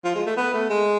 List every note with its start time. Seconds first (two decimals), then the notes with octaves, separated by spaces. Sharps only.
0.04 F3
0.15 G#3
0.27 A3
0.37 B3
0.54 A3
0.69 G#3